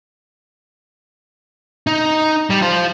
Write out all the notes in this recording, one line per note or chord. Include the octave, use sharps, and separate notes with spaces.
D#4
G3
F4 C5